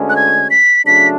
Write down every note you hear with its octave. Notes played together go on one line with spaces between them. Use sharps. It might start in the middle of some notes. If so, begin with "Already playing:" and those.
Already playing: D2 D3 G#3 C#4
F#6
G#6
B6
C#3 F#3 A3 D4 B6